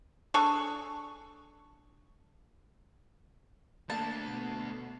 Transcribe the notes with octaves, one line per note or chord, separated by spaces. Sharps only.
D4 G#4 A4 C#6
A3 A#3 D4 A5
B2